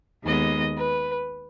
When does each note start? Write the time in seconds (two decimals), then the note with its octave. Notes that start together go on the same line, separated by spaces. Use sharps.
0.24 D#2 D#3 G#3 B3 D#5
0.76 B4